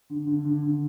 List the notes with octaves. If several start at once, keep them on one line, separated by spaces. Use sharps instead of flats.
D3
D3
D3
D3